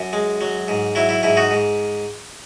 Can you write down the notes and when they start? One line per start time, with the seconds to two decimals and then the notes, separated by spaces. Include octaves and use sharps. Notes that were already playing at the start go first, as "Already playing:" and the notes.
Already playing: F#2
0.13 G#3
0.41 F#3
0.68 G#2
0.95 F#3 E4
1.09 E4
1.23 G#2 E4
1.37 D#4 F#4
1.51 G#2